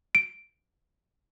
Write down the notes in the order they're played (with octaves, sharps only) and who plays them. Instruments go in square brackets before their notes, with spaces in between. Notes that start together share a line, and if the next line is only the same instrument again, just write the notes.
[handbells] D7